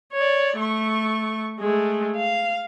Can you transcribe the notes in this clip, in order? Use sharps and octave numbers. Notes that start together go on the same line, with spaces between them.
C#5 D5
A3 C#6
G#3 A3
F5